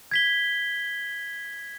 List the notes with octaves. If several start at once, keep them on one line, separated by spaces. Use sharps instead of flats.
G#6 B6 G7